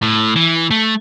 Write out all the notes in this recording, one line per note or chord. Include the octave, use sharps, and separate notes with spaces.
A2
E3
A3